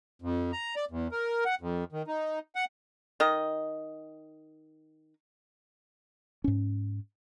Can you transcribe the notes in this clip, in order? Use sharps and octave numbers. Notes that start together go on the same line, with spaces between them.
F2
A#5
D5
E2
A#4
F#5
F2
D#3
D#4
F#5
D#3 D#5
G#2 C#4